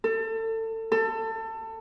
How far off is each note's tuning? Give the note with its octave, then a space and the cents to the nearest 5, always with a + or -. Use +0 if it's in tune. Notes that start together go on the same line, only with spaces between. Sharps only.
A4 +30
A4 +25